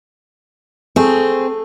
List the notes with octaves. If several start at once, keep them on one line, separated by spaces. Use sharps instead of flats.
A3 C4 G#4